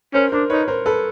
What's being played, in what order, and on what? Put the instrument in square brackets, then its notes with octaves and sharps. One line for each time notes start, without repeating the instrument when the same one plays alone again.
[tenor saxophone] C#4 [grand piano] A#4 C5
[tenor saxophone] D4 [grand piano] A#4 C5
[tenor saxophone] D#4 [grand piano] B4 C#5
[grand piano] A#4 C5
A4 B4